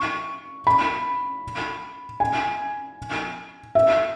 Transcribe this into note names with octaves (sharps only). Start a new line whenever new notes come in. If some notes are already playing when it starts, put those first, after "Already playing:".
Already playing: C#6
B5
G#5
E5